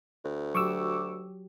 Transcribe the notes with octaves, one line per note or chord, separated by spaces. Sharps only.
D2
F#3 G4 C#6 D6 E6